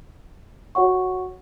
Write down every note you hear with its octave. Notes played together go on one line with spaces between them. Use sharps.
F#4 C#5 F#5 C#6